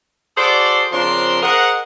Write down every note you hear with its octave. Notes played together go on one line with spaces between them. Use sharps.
F#4 G#4 A4 C5 D5
C#3 F3 C4 D4 A#4 C6
G#4 A#4 C5 D#5 F#5